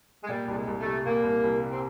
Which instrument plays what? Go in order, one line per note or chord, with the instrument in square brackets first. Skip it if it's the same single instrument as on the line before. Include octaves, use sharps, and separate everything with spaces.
[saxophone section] G#3
[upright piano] A#2 [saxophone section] G3
[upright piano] C2 [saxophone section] G3
[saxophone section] G#3
[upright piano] C2
[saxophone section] A3
[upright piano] G3
[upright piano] A#2 [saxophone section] A#3
[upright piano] C2
C2
G3
[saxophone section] C4